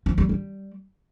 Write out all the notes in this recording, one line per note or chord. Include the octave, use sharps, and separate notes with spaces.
F3
G3
G3